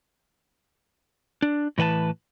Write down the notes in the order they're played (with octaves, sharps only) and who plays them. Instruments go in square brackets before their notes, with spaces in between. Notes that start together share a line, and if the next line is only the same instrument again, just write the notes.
[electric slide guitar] D4
A2 E3 B4 G5 A5